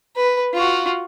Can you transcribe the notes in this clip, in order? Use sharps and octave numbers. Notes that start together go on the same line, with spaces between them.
B4
F4 F#4